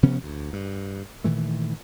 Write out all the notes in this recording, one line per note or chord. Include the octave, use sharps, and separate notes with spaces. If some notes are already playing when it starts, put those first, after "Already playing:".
C3 F3 B3 C#4
D2
G2
A#2 D#3 E3 A3